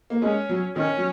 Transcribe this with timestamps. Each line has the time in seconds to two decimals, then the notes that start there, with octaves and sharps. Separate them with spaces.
0.10 A#3
0.22 G#3 C#4
0.49 F#3
0.76 D#3 C#4
0.97 F#3